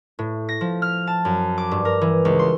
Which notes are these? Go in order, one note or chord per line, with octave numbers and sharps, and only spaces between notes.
A2
A#6
F3
F6
A5
F#2
D6
G2
A#4
E3
C#2
C6